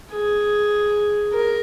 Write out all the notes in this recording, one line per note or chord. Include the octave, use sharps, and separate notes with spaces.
G#4
A#4